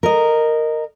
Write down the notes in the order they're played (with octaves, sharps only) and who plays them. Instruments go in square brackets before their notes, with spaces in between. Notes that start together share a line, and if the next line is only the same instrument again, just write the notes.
[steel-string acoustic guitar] A#4 D#5